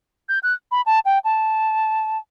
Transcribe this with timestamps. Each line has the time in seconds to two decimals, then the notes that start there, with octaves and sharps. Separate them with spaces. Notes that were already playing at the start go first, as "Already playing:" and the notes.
0.29 G6
0.43 F#6
0.71 B5
0.86 A5
1.05 G5
1.24 A5